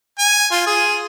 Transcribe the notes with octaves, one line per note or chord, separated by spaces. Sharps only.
G#5
F4
G#4